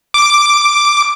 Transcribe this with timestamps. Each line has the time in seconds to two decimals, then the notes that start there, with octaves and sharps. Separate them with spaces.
0.14 D6